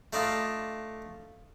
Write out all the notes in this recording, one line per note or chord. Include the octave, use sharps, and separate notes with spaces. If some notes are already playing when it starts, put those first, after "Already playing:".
A3 D4 D#4 F4